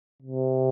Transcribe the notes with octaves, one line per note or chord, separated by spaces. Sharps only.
C3